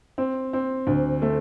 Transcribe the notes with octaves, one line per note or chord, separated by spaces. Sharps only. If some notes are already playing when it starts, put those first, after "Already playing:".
C4
C4
D2
A3